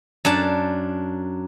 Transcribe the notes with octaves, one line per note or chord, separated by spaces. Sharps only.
F#2 D4 A5